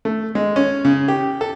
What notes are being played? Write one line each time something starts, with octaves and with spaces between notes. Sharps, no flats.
A3
G#3
C#4
C#3
G4
A4